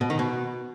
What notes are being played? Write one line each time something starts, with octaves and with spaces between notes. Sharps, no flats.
B2
D#3
B2